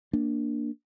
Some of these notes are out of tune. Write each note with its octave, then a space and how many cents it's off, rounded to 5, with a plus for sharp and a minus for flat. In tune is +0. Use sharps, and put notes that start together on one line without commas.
A#3 +0 D4 +0